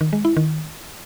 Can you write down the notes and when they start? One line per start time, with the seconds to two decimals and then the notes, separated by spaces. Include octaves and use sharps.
0.01 D#3
0.13 G#3
0.25 E4
0.37 D#3